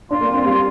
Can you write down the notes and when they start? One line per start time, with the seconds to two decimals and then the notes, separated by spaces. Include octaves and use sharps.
0.11 D4 F4
0.21 A#3
0.29 C4
0.34 F4
0.45 G3 F4